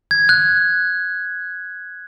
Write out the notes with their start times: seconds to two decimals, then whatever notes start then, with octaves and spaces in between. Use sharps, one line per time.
0.11 G#6
0.29 F#6